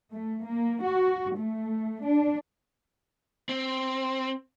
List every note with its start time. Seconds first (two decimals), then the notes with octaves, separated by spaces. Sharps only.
0.13 A3
0.47 A#3
0.85 F#4
1.37 A3
2.06 D4
3.49 C4